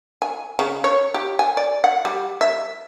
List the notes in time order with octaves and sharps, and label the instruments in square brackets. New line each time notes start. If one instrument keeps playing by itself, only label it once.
[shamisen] G#5
C#3
C#5
G4
G#5
D5
F#5
G3
E5